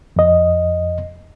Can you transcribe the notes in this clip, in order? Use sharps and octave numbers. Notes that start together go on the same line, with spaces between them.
F2 D#5